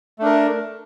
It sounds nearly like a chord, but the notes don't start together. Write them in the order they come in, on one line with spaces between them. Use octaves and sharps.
A3 D4 A#4